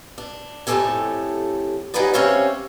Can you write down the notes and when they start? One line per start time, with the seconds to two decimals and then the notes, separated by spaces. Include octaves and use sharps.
0.18 D4
0.67 F2 A2 F3 G4 A4 G#5
1.94 F#3 D#4 G4 G#4 B4 D5
2.14 G3 C4 C#4 C#5 E5 F5